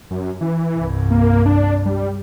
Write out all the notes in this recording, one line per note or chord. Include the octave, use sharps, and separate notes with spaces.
F#2
E3
C2 G2
A#3
D4
G3